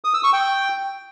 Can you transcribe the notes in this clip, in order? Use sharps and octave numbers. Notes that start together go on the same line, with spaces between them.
D#6
E6
C#6
G5